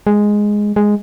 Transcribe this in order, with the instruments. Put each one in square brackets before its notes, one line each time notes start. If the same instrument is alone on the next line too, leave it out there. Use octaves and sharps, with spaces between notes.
[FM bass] G#3
G#3